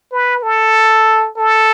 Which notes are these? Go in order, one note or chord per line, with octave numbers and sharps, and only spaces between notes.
B4
A4
A4